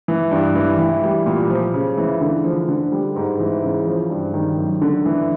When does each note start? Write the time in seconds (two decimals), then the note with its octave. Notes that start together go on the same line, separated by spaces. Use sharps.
0.08 E3
0.31 G2
0.55 E3
0.79 E3
1.03 G3
1.26 A#2
1.50 F3
1.74 C#3
1.97 E3
2.21 D3
2.44 F3
2.68 D3
2.92 G3
3.16 G#2
3.40 E3
3.63 C#3
3.87 F3
4.10 G2
4.34 D#3
4.58 F#2
4.81 D3
5.06 E3